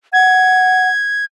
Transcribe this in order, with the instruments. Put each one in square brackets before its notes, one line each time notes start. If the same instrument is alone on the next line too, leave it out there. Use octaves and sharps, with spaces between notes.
[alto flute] F#5 [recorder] G#6